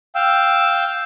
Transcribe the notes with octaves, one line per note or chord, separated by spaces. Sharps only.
F5 G5 E6